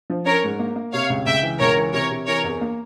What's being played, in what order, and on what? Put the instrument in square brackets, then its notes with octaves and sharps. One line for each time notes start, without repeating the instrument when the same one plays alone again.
[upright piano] F3
[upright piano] C#4 [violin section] A#4 C#5
[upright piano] G#2
A#3
A#3
[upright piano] C3 [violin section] C#5 F5
[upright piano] C#2
[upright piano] C#2 [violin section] E5 G5
[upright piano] E3
[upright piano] C#2 [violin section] A#4 C#5
[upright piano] E3
[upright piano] C3 [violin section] A#4 C#5
[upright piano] C3
[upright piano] E3 [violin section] A#4 C#5
[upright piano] E2
A#3